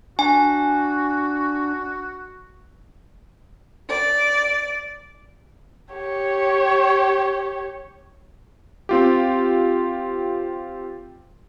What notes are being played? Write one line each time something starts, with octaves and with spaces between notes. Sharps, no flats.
D4 F#4 G#5
D5
G4 C#5
C4 F4 G4